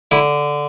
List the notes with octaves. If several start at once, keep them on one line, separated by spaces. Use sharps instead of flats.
D3 E4